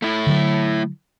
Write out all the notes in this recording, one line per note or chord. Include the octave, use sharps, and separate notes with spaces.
A3 E4
D3 F#3